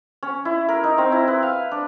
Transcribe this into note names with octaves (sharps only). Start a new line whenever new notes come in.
C#4
E4
A#4
D#4
C4
E4
B4
F5
D4